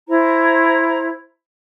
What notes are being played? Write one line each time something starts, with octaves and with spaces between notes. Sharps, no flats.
E4 C5 A#5